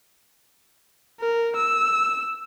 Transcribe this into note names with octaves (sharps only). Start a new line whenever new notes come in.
A#4
E6